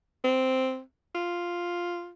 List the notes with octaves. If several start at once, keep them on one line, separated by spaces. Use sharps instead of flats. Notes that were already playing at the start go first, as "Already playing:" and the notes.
C4
F4